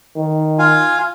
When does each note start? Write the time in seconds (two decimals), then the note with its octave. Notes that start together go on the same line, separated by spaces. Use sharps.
0.16 D#3
0.59 F4 F5 G#5